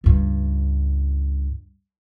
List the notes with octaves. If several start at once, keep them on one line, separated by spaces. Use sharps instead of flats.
C#2 G2